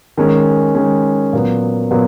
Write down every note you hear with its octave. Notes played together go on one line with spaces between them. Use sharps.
D#3 G#3 C#4
D#3 G#3 C#4
A#2 F#3 B3
A#2 F#3 B3